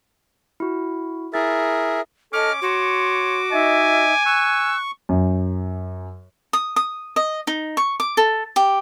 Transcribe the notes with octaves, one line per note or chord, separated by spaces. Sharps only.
E4 F#4
E4 G#4 A#4 E5 A6
C#4 A4 D#5 D6 F6
F#4 C#5 C6
D#4 D#5 E5 G#5
C#6 E6 F#6
F#2
D#6
D#6
D#5
D#4
C#6
D6
A4
G4